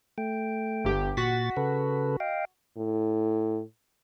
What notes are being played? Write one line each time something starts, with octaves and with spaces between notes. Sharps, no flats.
A3 G5
G1 G4
A#2 F#4 A6 B6
C#3 A4 B4
D#5 F5 G5
A2